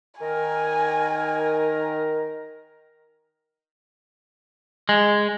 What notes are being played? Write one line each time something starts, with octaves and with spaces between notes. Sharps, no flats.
D#3 A#4 G#5
G#3